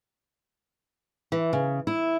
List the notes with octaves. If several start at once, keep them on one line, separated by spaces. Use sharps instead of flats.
E3
C#3
E4